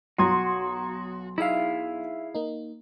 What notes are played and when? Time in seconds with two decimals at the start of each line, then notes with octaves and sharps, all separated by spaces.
0.18 B1 F#4 A#5 C6 D#6 G#6
1.38 D#4 E4 G#4 E5 F5
2.35 A#3 D#4